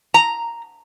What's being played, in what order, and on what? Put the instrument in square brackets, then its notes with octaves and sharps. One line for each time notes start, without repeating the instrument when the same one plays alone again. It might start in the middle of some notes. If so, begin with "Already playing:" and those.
[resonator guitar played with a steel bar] A#5